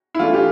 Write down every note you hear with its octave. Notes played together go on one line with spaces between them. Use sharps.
E4
E3 A3 D4 F4
G4